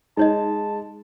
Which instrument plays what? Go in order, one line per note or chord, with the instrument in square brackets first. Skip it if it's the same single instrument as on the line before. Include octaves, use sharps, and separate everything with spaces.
[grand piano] G#3 [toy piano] D#4 C#5 D#5 [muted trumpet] A5